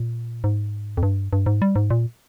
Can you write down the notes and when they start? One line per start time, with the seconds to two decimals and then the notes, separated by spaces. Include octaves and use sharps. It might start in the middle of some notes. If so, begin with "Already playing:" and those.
Already playing: A#2
0.44 G#2
0.97 F2
1.03 G2
1.33 G2
1.46 G#2
1.62 G3
1.76 G#2
1.90 A#2